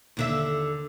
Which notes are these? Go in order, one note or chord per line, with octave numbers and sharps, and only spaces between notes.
D#2 D3 E5